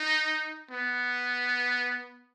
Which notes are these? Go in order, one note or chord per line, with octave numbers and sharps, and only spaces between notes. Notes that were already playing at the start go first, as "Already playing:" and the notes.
Already playing: D#4
B3